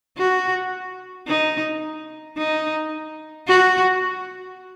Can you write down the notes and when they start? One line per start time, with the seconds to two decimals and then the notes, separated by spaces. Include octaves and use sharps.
0.18 F#4
1.28 D#4
2.38 D#4
3.48 F#4